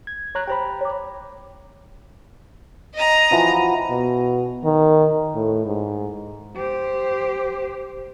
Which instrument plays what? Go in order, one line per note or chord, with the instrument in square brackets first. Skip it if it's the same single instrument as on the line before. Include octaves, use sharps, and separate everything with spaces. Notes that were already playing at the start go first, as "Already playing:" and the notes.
[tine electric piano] G#6
C#5 A#5 F#6
[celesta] G4 C5 [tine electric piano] G5 A#5 B5
[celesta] C#5 D6
[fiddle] D#5 A#5
[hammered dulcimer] E3 F3 F#4
[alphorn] B2
D#3
A2
G#2
[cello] G4 C5